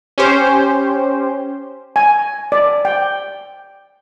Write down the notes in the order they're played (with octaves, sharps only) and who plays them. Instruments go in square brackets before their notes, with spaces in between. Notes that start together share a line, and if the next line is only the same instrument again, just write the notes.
[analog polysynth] C#4 G4 C5
[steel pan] G#5
D5
G5